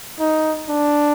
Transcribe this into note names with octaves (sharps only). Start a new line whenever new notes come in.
D#4
D4